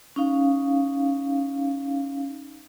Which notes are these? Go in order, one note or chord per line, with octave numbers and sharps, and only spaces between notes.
C#4 D#4 F5